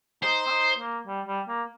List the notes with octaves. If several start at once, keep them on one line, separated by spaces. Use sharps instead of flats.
D#4 C5
C4
D#4
A#3
G3
G3
A#3